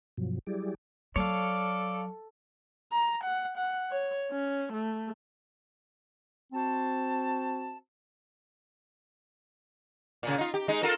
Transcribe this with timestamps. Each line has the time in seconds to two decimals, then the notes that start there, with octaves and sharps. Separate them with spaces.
0.18 G2 B2 F3 F#3
0.47 F#3 G3 E4 G4 G#4 D5
1.16 F#3 A4 C#5 D5 F5
2.93 A#5
3.24 F#5
3.58 F#5
3.92 C#5
4.31 C#4
4.73 A3
6.52 C4 F#4 C5 A5
10.23 A#2 C#3
10.38 D#4 F4
10.54 G4
10.68 G#3 D#4
10.83 F4 A4 A#4